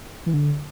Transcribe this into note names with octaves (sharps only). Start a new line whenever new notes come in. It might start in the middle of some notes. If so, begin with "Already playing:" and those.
E3
D3